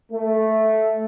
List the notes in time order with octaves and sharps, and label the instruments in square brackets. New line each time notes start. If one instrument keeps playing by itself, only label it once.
[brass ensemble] A3